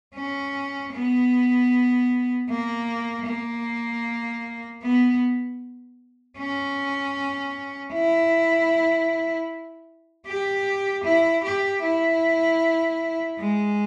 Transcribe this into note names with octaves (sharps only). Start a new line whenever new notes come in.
C#4
B3
A#3
A#3
B3
C#4
E4
G4
E4
G4
E4
G#3